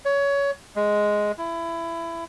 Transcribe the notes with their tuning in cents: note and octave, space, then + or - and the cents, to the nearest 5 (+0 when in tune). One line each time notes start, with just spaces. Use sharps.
C#5 +20
G#3 +5
E4 +20